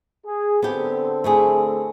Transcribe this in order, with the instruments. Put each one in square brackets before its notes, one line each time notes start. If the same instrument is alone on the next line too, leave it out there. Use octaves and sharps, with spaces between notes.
[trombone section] G#4
[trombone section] D3 C4 A4 [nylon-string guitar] B3 G4
[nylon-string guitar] A3 E4 G#4